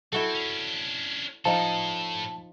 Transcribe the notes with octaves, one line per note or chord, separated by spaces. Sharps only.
C4 E4 F#4 A4
C#4 D4
A2 F3 D#4 A4 A5